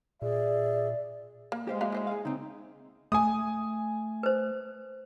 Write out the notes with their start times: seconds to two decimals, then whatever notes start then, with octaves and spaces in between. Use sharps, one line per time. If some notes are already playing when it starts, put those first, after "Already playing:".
0.22 A#2 G#4 D5 E5
1.52 A#3
1.67 G#3 G4 C5 F5
1.81 F#3 A#3 E5 F5
1.92 E4 C5 E5
2.07 G#4 F5
2.25 C#3 C4 D#4
3.12 A3 G#5 D#6
4.23 B4 C5